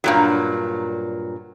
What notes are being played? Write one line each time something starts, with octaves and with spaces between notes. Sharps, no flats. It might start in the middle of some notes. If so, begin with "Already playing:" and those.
G2 A#2 F#3